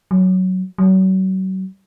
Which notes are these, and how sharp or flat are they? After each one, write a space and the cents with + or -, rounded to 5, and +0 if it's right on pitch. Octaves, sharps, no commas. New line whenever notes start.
F#3 +5
F#3 +35